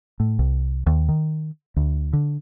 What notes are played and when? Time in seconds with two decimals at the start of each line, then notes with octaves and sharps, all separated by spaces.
0.20 A2
0.39 C2
0.87 D#2
1.09 D#3
1.76 D2
2.13 D3